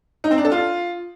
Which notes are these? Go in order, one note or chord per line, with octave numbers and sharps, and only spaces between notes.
D#4
C4
D4
A4
F4